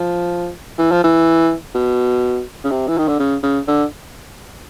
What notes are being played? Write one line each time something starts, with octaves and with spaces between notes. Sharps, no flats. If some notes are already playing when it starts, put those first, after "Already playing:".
Already playing: F3
E3
F3
E3
B2
C#3
C3
E3
D#3
D3
C#3
C#3
D3